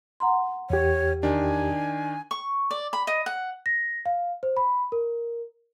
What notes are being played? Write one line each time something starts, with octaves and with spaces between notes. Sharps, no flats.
F#5 A#5 C6
E2 G4 C#5
D#3 D4 G#5
C#6
D5
B5
D#5
F#5
A#6
F5
C5
B5
A#4